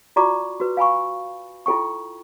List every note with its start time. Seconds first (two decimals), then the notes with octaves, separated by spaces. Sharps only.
0.16 F4 F#4 D5 A#5 C#6 D6
0.60 F#4 B4
0.77 F5 G#5 B5 C#6
1.66 E4 F4 A4 G5 C#6